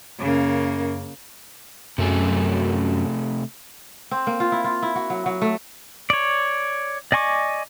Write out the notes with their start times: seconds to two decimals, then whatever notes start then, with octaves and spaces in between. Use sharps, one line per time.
0.19 F#2 C#3 A#3
1.98 F#2 C3 A3 G#4
4.11 C4
4.27 A#3
4.40 F4
4.52 E4
4.64 F4
4.83 E4
4.95 F#4
5.10 F#3
5.26 F#3
5.42 A3
6.10 C#5 D5
7.12 D5 D#5 G#5 C#6 D6